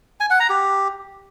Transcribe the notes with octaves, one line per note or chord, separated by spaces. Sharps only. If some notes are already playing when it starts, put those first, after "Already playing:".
G#5
F#5
A#5
G4